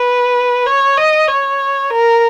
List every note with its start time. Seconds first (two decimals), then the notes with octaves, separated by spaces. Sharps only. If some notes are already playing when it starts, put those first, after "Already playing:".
Already playing: B4
0.66 C#5
0.97 D#5
1.28 C#5
1.90 A#4